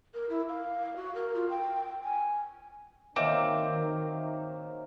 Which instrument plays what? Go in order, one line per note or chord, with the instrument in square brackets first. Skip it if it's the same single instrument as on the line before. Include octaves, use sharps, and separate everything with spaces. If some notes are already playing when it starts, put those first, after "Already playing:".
[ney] A#4
E4
F5
F#4
A#4
F4
G5
G#5
[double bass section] D#3 [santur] F#3 A#3 E5 [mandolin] C4 [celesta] D#5 D6